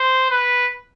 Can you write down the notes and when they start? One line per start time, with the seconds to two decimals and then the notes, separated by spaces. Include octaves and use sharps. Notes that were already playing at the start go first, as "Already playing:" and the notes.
Already playing: C5
0.31 B4